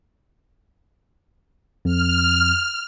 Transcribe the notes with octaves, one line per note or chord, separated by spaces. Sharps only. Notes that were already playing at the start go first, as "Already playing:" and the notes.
F2 F6